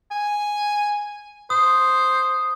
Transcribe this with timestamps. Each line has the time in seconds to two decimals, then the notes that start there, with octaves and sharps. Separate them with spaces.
0.11 G#5
1.50 C5 D#6